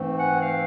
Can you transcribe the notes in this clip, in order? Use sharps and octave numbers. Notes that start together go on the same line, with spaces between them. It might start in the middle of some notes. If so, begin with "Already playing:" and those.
Already playing: G#2 E3 A3 C4
F#5 G#5
F5 G5